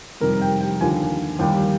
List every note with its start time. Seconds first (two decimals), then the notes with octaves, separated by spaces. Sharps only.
0.21 F2 C3 D#3 G3 A#4
0.41 G5
0.61 G5
0.80 D#2 D3 F3 G#5
1.39 D#2 D#3 G3 G5